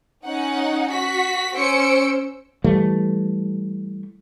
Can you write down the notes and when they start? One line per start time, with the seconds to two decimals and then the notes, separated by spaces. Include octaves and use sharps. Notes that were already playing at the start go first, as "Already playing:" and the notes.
0.25 C#4 D#4 F#5
0.90 F#4 B6
1.56 C#4 C5 E6 C#7 D7
2.64 E3 G3 A3